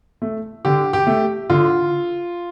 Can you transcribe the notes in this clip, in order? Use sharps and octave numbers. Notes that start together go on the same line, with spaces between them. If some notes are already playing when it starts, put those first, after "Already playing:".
A3
D3 G4
G4
A3
D3 F4